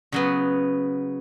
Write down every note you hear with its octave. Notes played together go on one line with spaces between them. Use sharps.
C#3 F#3 B3